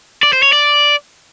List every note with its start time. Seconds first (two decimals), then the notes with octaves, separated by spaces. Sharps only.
0.23 D5
0.33 C5
0.43 C#5
0.53 D5